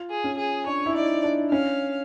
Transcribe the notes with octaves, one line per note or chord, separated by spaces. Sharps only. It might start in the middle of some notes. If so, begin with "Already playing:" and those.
Already playing: F4
G#4
C#4
G#4
D4 C#5
E4
D#4 D5
D4
C#4 F5